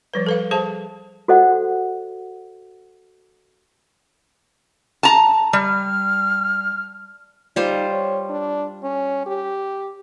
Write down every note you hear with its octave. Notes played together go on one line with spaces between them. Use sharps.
F3 G3 B4
A4 B4 F5
G#4 C5 A5
F#4 A4 C5 D#5 F#5
A5 A#5
G3 F6
G3 D#4 F4 C5
C#5
D4
C#4
G4